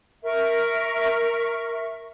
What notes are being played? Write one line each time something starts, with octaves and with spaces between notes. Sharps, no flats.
A#4 E5 C#6